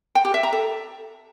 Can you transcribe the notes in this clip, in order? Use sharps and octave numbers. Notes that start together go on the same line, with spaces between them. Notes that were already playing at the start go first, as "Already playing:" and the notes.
G5
G4
E5
A#5
A4